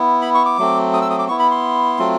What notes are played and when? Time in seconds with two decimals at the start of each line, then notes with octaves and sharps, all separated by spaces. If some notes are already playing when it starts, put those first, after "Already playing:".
Already playing: B3 E4
0.22 B5
0.35 C#6
0.45 D6
0.58 F#3 A3 C4
0.93 D#6
1.02 E6
1.10 D#6
1.19 D6
1.28 B3 E4 C#6
1.39 B5
1.51 C6
1.99 F#3 A3 C4 F4